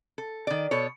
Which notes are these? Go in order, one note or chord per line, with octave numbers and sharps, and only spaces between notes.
A4
D#3 D5
B2 A4 C#5